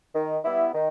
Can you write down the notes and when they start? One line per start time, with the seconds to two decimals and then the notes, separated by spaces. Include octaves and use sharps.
0.15 D#3
0.44 G3 B3 E4
0.74 D#3